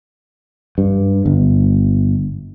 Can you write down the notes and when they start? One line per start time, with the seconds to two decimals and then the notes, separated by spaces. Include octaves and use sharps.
0.78 G2
1.26 G1